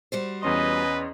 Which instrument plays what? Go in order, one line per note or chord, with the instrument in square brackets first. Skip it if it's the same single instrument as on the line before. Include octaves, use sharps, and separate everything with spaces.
[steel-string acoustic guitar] G3 F#4 C5
[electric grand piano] E2 C#4 C6 [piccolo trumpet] B4 [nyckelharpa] D#5